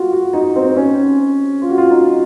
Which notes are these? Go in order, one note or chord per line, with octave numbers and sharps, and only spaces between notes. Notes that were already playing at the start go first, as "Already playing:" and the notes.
Already playing: F4 F#4
F#4
D#4
C4
C#4
F4
F#4
F4
D#4